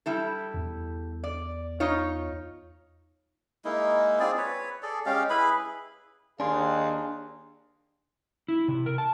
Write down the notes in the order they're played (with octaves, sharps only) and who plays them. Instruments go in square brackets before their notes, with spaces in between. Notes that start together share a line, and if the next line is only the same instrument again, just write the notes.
[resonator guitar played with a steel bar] G3 E4 A4
[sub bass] E2
[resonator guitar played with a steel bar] D5
D#4 F4 C#5
[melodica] G#3 A#3 D#4 E4
C4 F4 G#4 D5
B4 C#5
G#4 A4 D5
G#3 C#4 G4 F5
E4 G#4 B4 B5
[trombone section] D#2 [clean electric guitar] D4 [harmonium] G#4 F5 [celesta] G#5 C6
[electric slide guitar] E4
C3
A#4
A5